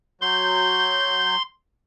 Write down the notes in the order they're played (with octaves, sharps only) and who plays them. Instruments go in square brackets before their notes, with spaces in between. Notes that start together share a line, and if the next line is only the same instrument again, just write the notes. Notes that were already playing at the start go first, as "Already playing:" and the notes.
[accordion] F#3 G6 [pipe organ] C6